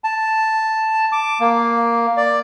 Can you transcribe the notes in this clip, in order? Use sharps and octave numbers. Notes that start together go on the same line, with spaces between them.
A5
D6
A#3
D5